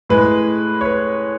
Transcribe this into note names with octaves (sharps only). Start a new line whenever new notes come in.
A2 G#3 B4
C#5
B4